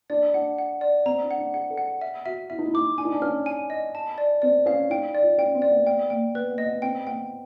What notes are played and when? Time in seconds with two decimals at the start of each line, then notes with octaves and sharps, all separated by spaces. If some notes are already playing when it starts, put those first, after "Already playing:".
0.10 D4 D5
0.34 D4 F#5
0.58 F#5
0.81 D5
1.06 C4 A#5
1.22 D4
1.31 F#5
1.38 D4
1.54 G#4 F#5
1.70 A4
1.78 F#5
2.01 E5
2.26 F#4 E5
2.50 E4 E5
2.59 D#4
2.65 E4
2.74 D#4 D6
2.98 D4 G#5
3.05 D#4
3.12 D4
3.22 C#4 F6
3.46 G#5
3.70 D#5
3.95 A5
4.18 D5
4.42 C4 D5
4.66 C#4 F5
4.90 D#4 G5
5.15 D5
5.23 F4
5.38 C#4 G5
5.55 C4
5.62 D5
5.71 B3
5.86 B3 G5
6.10 A#3 G5
6.34 B3 B4
6.50 B3
6.58 D#5
6.66 B3
6.82 C4 G5
7.07 B3 G5